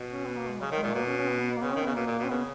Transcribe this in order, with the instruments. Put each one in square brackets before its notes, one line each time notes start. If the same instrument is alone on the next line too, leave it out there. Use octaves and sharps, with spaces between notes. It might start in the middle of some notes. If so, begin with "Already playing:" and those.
Already playing: [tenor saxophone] B2
[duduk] C#4
B3
A#3
G#3
[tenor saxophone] C#3 [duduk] F#3
[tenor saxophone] D#3
[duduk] G#3
[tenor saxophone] A#2
[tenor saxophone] B2 [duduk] A#3
[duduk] C#4
C#4
B3
B3
B3
A#3
[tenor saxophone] C#3 [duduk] B3
[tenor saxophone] D#3 [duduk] C#4
[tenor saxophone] C#3 [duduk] B3
[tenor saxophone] B2 [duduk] A#3
[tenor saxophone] A#2
B2
[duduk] C#4
[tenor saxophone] C#3 [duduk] B3